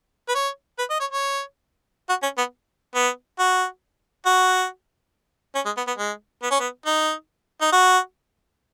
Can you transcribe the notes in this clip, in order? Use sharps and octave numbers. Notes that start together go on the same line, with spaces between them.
B4
C#5
B4
D#5
C#5
C#5
F#4
C#4
B3
B3
F#4
F#4
C#4
G#3
B3
B3
G#3
B3
C#4
B3
D#4
D#4
F#4